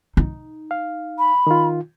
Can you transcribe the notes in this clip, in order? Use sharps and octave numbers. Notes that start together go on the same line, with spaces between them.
D#4
F5
B5
D#3 F4